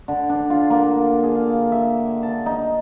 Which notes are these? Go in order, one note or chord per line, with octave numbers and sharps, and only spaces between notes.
D3
D4
F4
A#3
G#4
F5
E5
A5
D#4